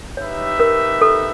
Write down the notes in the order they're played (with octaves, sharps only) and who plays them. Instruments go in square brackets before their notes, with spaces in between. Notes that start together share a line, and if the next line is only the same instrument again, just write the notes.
[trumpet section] D#4 G4 B4 E5 [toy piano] C#5
[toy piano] A#4
A4